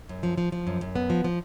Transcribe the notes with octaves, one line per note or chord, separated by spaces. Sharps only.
F#2
F3
F3
F3
F#2
F#2
B3
F3
F3